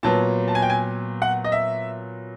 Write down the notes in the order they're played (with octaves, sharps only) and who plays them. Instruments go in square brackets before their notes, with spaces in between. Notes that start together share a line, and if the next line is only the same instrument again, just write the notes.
[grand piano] A#2 F#3 B3 A5
A5
G#5
G5
G#5
F#5
D#5
E5